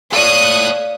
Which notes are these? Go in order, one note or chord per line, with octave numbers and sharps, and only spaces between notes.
A4 C#5 D5 F5 D#6 F#6